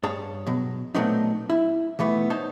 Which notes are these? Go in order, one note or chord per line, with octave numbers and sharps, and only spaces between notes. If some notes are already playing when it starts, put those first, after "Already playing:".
G2 G#4 C#5 A5
B2 F#3
A#2 F#3 A3 B3 C4 D#4
E4
B1 E3 A3 B3
D#4 C5 C#5 A5